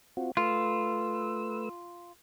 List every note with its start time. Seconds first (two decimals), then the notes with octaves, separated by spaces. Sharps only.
0.17 C4 F4 F#4
0.37 A3 F4 B4 E6